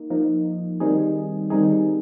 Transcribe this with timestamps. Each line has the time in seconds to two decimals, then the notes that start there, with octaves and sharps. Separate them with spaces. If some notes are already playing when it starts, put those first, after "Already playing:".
Already playing: A#3 D#4
0.10 F3 A#3 D#4
0.80 D#3 G3 C4 D#4 G#4
1.50 D#3 G3 C4 D#4 G#4